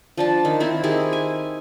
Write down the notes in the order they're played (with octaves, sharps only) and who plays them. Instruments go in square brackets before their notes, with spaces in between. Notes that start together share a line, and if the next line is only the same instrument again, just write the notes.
[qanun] F3 D4 A5
D#3
C4 E4
D#3 E4 G4 G#4
G#5